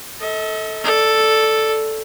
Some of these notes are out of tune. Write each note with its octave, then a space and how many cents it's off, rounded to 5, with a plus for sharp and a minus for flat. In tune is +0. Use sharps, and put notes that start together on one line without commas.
A4 +0 D#5 +40
A4 +0 D5 +0